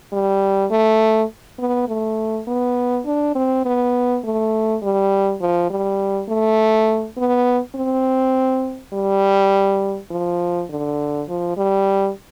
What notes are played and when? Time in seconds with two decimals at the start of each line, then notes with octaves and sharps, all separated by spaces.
0.13 G3
0.71 A3
1.59 B3
1.88 A3
2.48 B3
3.06 D4
3.35 C4
3.66 B3
4.24 A3
4.82 G3
5.41 F3
5.70 G3
6.29 A3
7.17 B3
7.76 C4
8.93 G3
10.11 F3
10.70 D3
11.29 F3
11.57 G3